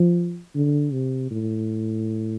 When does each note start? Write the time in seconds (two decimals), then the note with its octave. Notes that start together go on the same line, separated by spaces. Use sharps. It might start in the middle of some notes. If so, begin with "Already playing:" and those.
Already playing: F3
0.55 D3
0.93 C3
1.31 A2